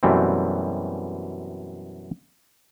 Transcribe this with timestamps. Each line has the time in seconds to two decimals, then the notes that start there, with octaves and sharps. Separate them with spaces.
0.03 F#2 B2 E3 G3 A3 C4